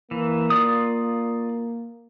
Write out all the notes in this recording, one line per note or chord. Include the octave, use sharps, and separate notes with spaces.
E3 A#3
F4 D5 D#6